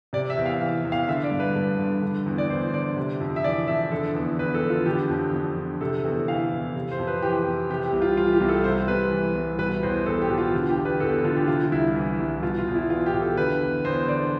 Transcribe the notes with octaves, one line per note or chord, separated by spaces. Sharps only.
C3 D5
E5
E2
F5
E3 F5
E2
F5
D3 E5
D5
G2
B4
G2
D3
D3
E2
D5
E2 C5
D3 D5
C3
F2
E5
E3 D5
F2 E5
D3 A4
E2
E2 B4
A4
D3
F4
D3 G4
F2
F2
D3
C3 A4
E2 A4
E3 F5
E2
C3
C5
F2
B4
E3 G4
F2
C3 G4
G4
C2
F4
E3 F4
G4
C2
A4
C3 C5
C2 B4
E3
C2
B2 B4
E2 C5
E2 A4
G4
B2
F4
D3 F4
G4
E2
B4
E2 A4
D3 F4
G4
C3 F4
C2 E4
E3
C2
B2 F4
F4
E2
E4
E2 F4
G4
B2
A4
D3 B4
E2
E2 C5
D3 D5